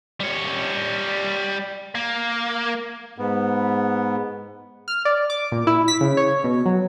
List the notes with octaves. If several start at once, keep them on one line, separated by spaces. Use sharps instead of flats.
G3 C#5
A#3
G#2 B3
F6
D5
D6
A#2
E4
B6
C#3
C#5
B2
F#3